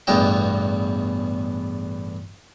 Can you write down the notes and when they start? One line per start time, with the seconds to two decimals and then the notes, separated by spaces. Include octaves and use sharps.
0.07 A1 E2 G2 B2 D#5 G5